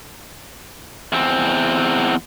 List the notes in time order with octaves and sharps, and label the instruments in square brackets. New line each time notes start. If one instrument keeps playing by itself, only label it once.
[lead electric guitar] E2 C4